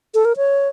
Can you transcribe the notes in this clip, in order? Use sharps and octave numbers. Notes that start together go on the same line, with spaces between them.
A4
A#4
C#5